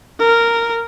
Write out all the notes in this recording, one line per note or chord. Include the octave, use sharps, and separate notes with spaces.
A#4